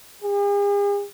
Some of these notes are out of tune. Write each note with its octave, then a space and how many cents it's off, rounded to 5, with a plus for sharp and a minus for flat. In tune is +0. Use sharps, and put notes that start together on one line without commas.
G#4 -45